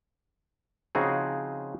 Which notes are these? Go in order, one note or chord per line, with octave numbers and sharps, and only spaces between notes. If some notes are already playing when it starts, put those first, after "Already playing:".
C#3 F3 C4 D#4 F#4 G#4